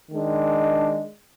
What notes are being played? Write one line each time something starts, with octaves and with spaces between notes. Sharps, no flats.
D#3 G#3 D4